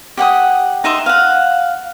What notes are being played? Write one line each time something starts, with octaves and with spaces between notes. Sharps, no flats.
G4 F#5 G5 D#6
D#4 D#5 E5 C6
F5 F#5